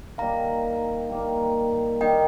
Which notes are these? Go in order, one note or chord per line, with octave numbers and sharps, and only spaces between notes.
D#3 G3 A#3 D#4 F5 A#5
D#3 G3 A#3 D#4
D#3 G3 A#3 D#4 D#5 G5